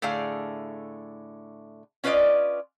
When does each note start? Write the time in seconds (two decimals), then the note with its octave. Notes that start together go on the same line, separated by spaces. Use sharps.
0.02 A2 D3 A3 G#4 F5
2.04 C#4 F4 B4 C5 D5 D#5